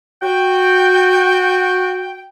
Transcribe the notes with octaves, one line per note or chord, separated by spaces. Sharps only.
F#4 G5